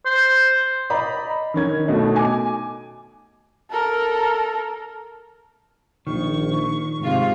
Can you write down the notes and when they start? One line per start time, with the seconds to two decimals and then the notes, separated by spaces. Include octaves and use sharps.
0.06 C5
0.90 D5 D#5 A#5 B5
1.54 D#3 C#4 G#6
1.87 B2 A3 D#4
2.16 G#5 D6
3.71 A4 A#4
6.07 A#1 D#3 C#6
7.01 G#2 C3 F4